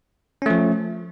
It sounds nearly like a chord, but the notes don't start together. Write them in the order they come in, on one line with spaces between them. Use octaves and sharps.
C#4 A3 F3